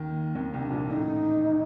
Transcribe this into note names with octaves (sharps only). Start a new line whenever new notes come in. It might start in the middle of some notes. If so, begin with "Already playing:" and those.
Already playing: D#2 D#3
A#3
D#2 D#3 C4
C2 C3 C4
D4
A#1 A#2
A1 A2 D#4